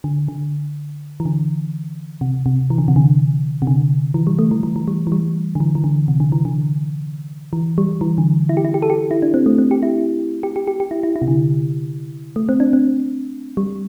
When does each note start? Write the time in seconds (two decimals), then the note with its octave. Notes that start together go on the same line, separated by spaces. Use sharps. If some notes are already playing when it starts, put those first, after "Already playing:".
0.04 D3
0.28 D3
1.20 E3
1.26 D3
2.21 C3
2.46 C3
2.70 E3
2.78 D3
2.88 C3
2.96 D3
3.62 C3
3.67 D3
4.14 E3
4.27 G3
4.39 A3
4.51 E3
4.63 E3
4.76 E3
4.88 G3
5.07 E3
5.12 G3
5.55 D3
5.60 E3
5.75 E3
5.84 D3
6.08 C3
6.20 D3
6.32 E3
6.45 D3
7.53 E3
7.78 G3
8.01 E3
8.18 D3
8.49 E4
8.57 G4
8.65 E4
8.74 G4
8.82 A4
8.90 G4
9.11 E4
9.22 D4
9.34 C4
9.46 A3
9.58 C4
9.71 G4
9.83 E4
10.43 G4
10.56 G4
10.67 G4
10.80 G4
10.91 E4
11.03 E4
11.16 E4
11.22 C3
11.28 D3
12.36 A3
12.49 C4
12.60 D4
12.73 C4
13.57 G3